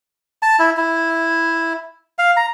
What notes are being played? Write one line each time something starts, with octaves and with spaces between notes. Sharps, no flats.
A5
E4
E4
F5
A#5